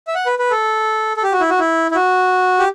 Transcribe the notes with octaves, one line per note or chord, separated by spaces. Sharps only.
E5
F#5
B4
B4
A4
A4
G4
F#4
E4
F#4
E4
E4
F#4
G4